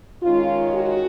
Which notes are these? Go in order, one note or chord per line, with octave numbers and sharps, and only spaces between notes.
D#3 G#3 C#4 F4
F#4